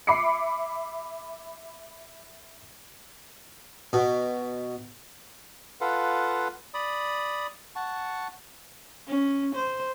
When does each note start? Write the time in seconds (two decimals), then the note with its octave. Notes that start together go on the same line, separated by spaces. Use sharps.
0.07 E5 B5 D6 C7 C#7
3.93 B2
5.81 F4 A4 B4 F5 F#5
6.74 D5 B5 D#6
7.76 F#5 A5 C#6
9.07 C#4
9.55 C5